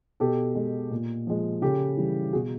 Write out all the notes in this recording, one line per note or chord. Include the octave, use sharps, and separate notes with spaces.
B2 G4 A4
G#3
A#2
F3 G#3
C#3 G4 A4
E3 G3
B2 F#4 G#4